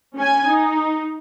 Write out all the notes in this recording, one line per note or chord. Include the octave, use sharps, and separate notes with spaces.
C#4 G#5
D#4